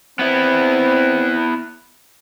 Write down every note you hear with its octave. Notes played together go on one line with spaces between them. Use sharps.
B3 C4 E4